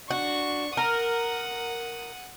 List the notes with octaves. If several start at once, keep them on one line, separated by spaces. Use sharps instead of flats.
D4 F#4 C#6
A#4 F#5 D#6